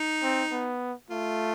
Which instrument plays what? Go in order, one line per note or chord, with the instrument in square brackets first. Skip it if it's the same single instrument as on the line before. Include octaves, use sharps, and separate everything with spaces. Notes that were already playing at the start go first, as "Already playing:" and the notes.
Already playing: [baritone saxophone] D#4
[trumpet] C4
B3
[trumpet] A3 [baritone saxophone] F4